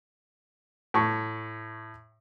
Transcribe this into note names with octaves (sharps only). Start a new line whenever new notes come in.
A2 C#6